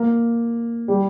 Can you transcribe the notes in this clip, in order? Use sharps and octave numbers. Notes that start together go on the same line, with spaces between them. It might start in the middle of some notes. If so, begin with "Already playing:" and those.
Already playing: A#3
G3